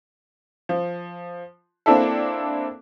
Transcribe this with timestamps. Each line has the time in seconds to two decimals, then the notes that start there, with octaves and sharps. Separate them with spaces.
0.69 F3
1.86 A#3 C4 D4 E4 A4